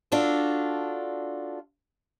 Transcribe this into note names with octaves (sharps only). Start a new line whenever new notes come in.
D4 F4 F#4 A4